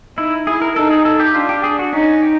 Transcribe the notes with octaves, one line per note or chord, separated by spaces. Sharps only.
D#4 E4
E4 G#4
A#4
D#4 A4
G#4
A4
G4
D4 F4
G4
G#4
F#4
C#4 D#4
G4